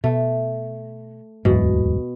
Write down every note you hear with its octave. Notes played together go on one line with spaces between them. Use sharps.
B2 A3
D1 E2 G#2 B2